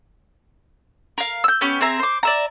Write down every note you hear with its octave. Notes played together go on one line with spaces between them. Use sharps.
A#4 F5
E6 G6
B3 C#4 G4
C4 G#4 E5 A#5
C5 D6
D5 E5 A#5